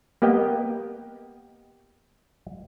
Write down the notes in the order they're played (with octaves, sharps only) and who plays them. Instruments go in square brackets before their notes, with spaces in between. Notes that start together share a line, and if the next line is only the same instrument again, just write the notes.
[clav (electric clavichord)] A#3 B3 G4 D#5 G5